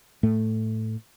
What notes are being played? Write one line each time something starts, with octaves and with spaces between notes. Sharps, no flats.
A2 A3